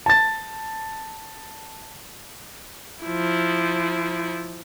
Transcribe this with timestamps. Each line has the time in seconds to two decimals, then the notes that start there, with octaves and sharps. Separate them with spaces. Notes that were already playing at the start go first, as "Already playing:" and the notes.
0.06 A5 A6
3.03 F3 E4